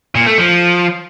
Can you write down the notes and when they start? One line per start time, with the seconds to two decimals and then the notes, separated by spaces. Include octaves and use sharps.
0.15 A#2
0.27 A3
0.38 F3